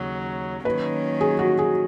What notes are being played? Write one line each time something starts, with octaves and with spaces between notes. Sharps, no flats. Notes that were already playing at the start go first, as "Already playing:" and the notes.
Already playing: D#2 C#3 F#3
D#3 F#3 A#3 C#4 B4
G#4
F#4
G#4